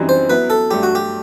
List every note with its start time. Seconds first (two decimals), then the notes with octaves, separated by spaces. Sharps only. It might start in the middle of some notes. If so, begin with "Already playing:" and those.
Already playing: F#2 E3 G3 C4 D#4
0.09 C5
0.30 F#3 B3 E4 B4
0.50 A4
0.70 G2 F#3 A3 G4
0.83 F#4
0.95 G4